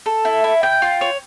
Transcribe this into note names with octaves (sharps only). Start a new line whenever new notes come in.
A4
E4
E4
G5
F4
C#5